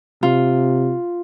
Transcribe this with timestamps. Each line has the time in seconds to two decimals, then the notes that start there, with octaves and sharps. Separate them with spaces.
0.23 C3 F4